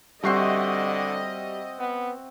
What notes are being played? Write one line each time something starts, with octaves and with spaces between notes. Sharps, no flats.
D3 G3 C4 F#4 D#5 E5 C#6 C7
B3